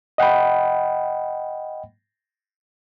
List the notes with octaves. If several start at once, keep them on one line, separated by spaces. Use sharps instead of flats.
D#5 F#5 G5 B5